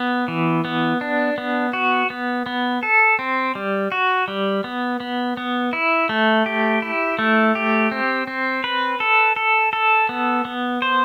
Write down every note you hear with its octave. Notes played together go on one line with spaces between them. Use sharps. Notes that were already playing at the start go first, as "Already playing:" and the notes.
Already playing: B3
E3
B3
D4
B3
F#4
B3
B3
A4
C4
G3
F#4
G3
B3
B3
B3
E4
A3
G4
E4
A3
G4
C4
C4
B4
A4
A4
A4
B3
B3
C5